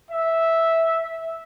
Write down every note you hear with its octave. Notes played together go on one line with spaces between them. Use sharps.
E5